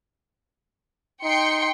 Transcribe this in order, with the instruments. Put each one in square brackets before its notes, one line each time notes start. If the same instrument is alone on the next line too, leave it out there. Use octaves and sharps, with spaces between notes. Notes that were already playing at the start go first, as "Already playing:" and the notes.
[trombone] D#4 [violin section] G5 C6 C#7